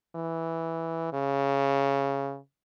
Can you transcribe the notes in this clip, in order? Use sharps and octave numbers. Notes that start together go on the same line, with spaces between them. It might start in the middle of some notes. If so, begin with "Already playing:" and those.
E3
C#3